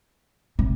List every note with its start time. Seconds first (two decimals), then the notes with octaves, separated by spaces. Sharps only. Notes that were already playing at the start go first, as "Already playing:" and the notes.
0.59 C3